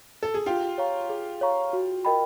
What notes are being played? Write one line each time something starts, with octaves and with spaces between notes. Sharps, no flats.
A4
G#4
F4 G4 G#4
C#5 F5 A#5 C#6
G#4
C#5 F5 A#5 C#6
F#4
A#4 D#5 G5 B5